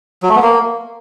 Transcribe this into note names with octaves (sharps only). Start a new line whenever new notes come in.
F#3
A3
B3
A#3